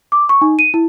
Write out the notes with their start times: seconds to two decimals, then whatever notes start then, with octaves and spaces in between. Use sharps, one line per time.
0.12 D6
0.29 C#6
0.41 D#4
0.59 D#7
0.74 E4